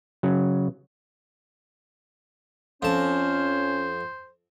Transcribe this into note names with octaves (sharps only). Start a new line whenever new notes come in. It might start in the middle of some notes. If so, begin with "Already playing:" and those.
C#3 F#3
F2 C#4 C5 A5